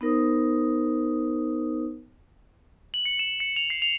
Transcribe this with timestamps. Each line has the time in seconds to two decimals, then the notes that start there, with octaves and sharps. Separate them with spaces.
0.01 B3 D#4 A#4 C5 D#6
2.94 F#7
3.05 C#7
3.19 E7
3.40 C#7
3.56 F7
3.70 C7
3.82 F7